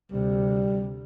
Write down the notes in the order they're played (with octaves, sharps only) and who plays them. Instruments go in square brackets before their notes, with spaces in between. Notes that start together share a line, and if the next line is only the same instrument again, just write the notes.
[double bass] D2 C3 [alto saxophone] G3